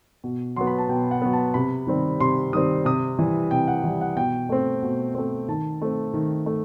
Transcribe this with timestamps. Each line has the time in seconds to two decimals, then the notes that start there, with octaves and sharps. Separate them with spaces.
0.24 B2
0.56 F#3 B3 C6
0.67 B5
0.78 A5
0.89 B2 G5
1.11 F#5
1.22 F#3 B3
1.33 A5
1.54 C3 B5
1.87 D#3 G3 C4
2.20 C3 C6
2.53 D#3 G3 C4 D#6
2.85 C3 D#6
3.19 E3 G3
3.51 C3 G5
3.68 F#5
3.84 E3 G3
4.01 F#5
4.16 B2 G5
4.49 A3 C4
4.83 B2
5.15 A3 C4
5.48 D#3 A5
5.82 A3 C4
6.14 D#3
6.46 A3